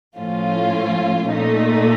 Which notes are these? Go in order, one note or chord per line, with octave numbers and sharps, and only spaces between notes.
A2 F3 A3 C#4 F4
A#2 A3 D#4